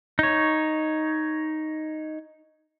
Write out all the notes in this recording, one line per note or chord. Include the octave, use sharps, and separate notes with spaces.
D#4 C#5